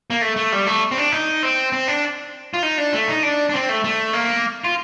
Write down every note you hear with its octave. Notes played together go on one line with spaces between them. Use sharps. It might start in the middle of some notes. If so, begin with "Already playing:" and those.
A#3
A3
A3
G3
A3
C4
D4
D#4
C4
C4
D4
F4
D#4
D4
A3
D#4
D4
D4
C4
A3
A3
A#3
F4